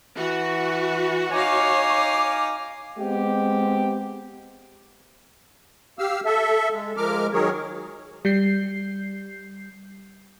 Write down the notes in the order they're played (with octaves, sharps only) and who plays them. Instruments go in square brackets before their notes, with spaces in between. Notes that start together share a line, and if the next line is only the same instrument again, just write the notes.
[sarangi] E3 [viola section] F#4
[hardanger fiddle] D#4 F5 [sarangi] C#5 [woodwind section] G#5 D6
[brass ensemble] G#3 B3 C4 G4
[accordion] G4 F5 E6 F6
A4 E5
G#3
F3 G#3 A#4 D6 F6
D#3 F#3 G#4 A#4 C#5
[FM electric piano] G3 G6 C7